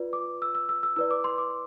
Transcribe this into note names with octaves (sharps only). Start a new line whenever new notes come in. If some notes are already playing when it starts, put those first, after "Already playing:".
Already playing: F4 B4 D5
D6
E6
E6
E6
E6
E4 B4 D5 E6
D6
C6
D6